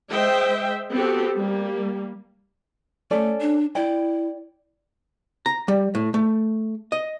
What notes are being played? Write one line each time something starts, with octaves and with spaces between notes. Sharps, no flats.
G#3 C5 D#5 E5 G5
B3 C4 F#4 G4 A4
G3 A#3
A3 C#4 A4 D5
D4
E4 D5 G5
A#5
G3
A2
A3
D#5